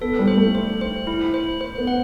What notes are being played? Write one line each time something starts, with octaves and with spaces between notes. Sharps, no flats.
B3 A4
G3
C5
A3
C5
C5
E4
C5
C5
B3
F#5